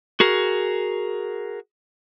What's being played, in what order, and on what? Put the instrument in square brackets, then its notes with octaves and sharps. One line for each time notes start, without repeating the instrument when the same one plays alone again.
[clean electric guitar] F#4 G#4 A#4